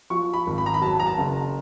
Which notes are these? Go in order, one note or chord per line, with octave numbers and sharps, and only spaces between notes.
F3 C#6
B5
G#1
B5
A#5
B5
F#3 A5
A#5
A5
F#1